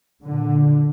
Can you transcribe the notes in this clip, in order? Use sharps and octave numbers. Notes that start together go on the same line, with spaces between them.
A#2 D3